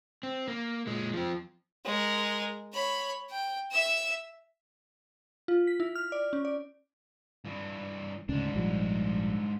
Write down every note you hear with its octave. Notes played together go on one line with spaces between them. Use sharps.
C4
A#3
A#2 G#3
F3 C4
G#3 A#4
C#5 B5
G5
E5 E6
F4
B6
E4
F6
D5
C#4
D5
G2 E3
D2 G#2 C#3 C#4 D4
A#1 F3 G3